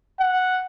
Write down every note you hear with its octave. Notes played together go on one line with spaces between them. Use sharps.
F#5